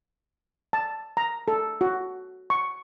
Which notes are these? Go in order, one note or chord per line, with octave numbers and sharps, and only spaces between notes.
A5
A#5
A4
F#4
C#6